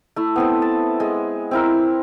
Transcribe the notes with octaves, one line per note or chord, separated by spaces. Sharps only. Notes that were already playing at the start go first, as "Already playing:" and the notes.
A3 E4
B3 C4 A4
A5
G#3
C4 E4 A#4